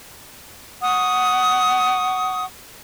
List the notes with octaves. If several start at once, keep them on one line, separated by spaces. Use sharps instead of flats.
F#5 C#6 D#6